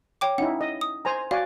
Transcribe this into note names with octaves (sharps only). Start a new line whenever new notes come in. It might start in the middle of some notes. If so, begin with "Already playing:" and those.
C#5 G5 D6
C#4 D#4 E4 F#5
D#5
D#6
C5 G#5 A#5
F#4 D5 F5 G#5